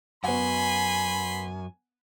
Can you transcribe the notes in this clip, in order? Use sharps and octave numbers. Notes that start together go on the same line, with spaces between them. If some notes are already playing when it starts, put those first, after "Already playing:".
F#2 B3 F#5 G#5 B5 C6